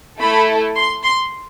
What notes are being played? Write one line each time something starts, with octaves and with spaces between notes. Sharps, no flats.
A3 E4 A4 B5
C6
C6